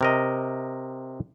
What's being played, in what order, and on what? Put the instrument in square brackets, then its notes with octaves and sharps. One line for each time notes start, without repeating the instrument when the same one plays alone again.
[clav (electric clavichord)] C3 A#4 D#5